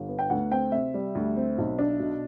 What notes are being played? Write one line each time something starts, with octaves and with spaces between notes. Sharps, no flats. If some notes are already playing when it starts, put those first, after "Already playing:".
Already playing: G1
B3
G5
D2 F#5
C4 G5
C3 E5
G3
D2
C4
B1
D4
B2